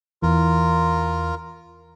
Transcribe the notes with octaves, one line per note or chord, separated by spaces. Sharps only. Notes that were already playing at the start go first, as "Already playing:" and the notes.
E2 E3 F4 A#4